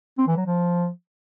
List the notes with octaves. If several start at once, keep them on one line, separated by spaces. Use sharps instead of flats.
C4
E3
F#3
F3